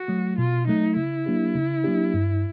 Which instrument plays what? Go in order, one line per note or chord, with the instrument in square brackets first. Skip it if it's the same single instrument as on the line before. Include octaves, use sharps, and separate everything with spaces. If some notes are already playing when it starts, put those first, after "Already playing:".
Already playing: [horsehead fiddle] F#4
[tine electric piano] F#3 A3
[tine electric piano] B2 [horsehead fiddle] F4
[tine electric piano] F#3 A3 [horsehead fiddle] D#4
[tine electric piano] C#3 [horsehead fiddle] E4
[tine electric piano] F#3 A#3 D4 G4
C#3
F#3 A#3 D4 G4
G2